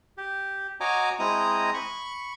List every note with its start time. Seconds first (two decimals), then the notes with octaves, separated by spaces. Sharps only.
0.17 G4
0.80 F#4 C#5 D#5 G#5 A#5 D6
1.19 G#3 C4 E4 D#5 A#5 D#6
1.74 B5 C#6